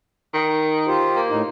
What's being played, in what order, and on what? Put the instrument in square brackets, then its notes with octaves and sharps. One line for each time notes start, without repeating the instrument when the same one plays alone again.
[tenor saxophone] D#3
[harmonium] F4 G4 C5
[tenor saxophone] A#3
[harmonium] A2 D#4